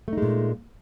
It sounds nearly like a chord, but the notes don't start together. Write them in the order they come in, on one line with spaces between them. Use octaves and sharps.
A3 D#4 G#3 A#2